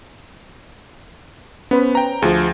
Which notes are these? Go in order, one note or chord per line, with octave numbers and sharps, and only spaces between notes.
B3 C#4 B4 C5
G5 A#5
D2 F3 G#4